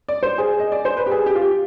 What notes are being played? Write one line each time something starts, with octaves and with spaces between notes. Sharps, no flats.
D5
C5
G#4
D#5
D5
C5
B4
G4
G#4
G4
F4
G4